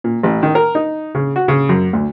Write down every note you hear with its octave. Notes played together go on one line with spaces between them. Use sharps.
A#2
A1
D#3
A#4
D#4
C#3
F#4
C#3
F#2
D2